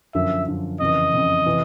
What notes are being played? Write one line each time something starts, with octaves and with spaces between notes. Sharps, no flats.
F#2 D3 F3 E5
F#2 D3 F3
F2 C#3 E3 D#5
F2 C#3 E3
C3 E3